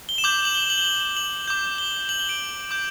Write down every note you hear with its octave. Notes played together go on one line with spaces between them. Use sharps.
G7
E7
D6 G6 F#7
F#7
G7
F#7
G7
F#7
F#7
D6 G6
G7
F#7
G7
D7
D6 G6